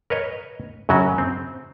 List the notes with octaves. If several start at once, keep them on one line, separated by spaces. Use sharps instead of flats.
A#4 B4 C#5 D#5
F#2 C#3 F#3 C#4 F#4
C4